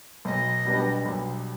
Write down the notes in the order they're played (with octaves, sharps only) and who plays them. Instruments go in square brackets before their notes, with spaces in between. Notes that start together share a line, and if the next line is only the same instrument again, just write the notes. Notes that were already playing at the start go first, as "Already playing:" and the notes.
[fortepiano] B1 [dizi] D#5
[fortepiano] B2 G3 B3 D4
B1